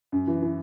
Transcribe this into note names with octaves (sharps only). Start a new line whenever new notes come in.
F#2
E3
E3